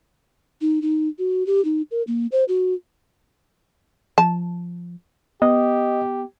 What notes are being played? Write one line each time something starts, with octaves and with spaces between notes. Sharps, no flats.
D#4
D#4
F#4
G4
D#4
A#4
A#3
C5
F#4
F3 A5
B3 G4 D#5